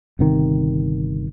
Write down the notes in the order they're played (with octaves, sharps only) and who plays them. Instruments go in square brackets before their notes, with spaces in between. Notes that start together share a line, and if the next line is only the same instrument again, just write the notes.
[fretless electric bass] G1 C3 D#3